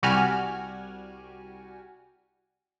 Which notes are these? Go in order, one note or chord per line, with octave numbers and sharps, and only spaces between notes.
C2 G3 F#4 G4 G#5 F6